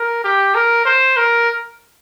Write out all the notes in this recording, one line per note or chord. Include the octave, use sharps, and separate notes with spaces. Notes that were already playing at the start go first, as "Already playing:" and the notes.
Already playing: A#4
G4
A#4
C5
A#4